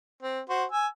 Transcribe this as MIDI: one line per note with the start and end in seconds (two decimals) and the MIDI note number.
0.23 0.40 60
0.49 0.64 66
0.49 0.64 72
0.71 0.87 80
0.71 0.87 88